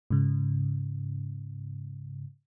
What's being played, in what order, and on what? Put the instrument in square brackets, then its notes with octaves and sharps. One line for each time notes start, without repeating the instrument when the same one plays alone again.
[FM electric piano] G#2 C#3